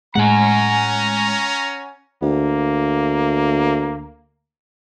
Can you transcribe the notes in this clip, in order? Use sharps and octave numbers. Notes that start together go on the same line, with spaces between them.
A2 G#3 C#4 F#5 G#5 A#5
D2 A#3